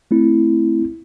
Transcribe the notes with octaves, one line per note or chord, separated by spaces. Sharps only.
A3 C4 E4